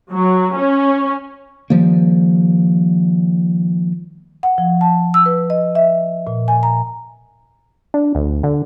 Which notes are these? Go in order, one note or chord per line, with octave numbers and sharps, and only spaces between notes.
F#3
C#4
D#3 F3 G3 A#3
F#5
F3
A5
E6
B4
D#5
E5
A#2
G#5
A#5
D4
D2
D3